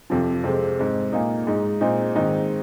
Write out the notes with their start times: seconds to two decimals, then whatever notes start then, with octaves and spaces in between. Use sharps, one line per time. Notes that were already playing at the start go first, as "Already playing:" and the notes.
0.10 F2 C3 F3
0.44 F2 C3 G#3 C4
0.79 G#2 G#3 C4
1.13 A#2 A#3 D#4
1.47 G#2 G#3 D#4
1.81 A#2 G#3 C4 D#4
2.15 G#2 D#3 C4 D#4